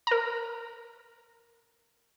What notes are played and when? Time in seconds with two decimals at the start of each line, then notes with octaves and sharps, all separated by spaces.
0.07 A#4 A#5